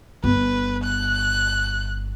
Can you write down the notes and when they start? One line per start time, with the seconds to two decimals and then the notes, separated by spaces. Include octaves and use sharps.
0.24 G1 B4
0.84 F#6